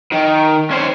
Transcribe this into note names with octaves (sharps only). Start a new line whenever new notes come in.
D#3
C#4 C5